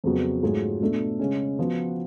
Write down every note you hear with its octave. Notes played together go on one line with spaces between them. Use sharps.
F2 C#3 F#3 B3
G#2 F#3 A3 F4 G#4
B2 A3 D4
C#3 G#3 C#4
F3 B3 F#4